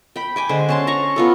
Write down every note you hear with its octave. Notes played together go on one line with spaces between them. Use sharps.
G5 B5
G5 G#5 D6
D3 G#3 C5
C#4 A5 C6
A#5 C#6
B3 F4 A4